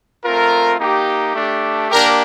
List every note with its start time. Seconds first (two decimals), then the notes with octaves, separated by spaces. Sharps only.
0.24 A3 C4 F4 A#4
0.79 A#3 D#4 G4
1.35 A3 D4 G4
1.91 A#3 D4 G4 A#4